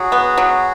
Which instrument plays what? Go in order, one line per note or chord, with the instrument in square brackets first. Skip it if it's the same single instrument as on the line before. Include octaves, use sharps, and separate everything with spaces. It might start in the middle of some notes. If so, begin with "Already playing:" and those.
Already playing: [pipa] F#3 [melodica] F#4 G#4
[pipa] B3
F#3